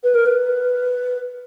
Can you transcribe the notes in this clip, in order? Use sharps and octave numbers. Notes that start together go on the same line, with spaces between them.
B4
A#4
B4